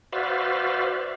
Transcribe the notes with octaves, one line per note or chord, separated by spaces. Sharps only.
F#4 B4 C5 D5 E5 F5